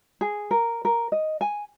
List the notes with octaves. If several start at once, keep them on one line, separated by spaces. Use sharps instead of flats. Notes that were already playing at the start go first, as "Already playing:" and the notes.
G#4
A#4
A#4
D#5
G#5